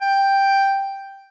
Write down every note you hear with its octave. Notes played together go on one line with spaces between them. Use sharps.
G5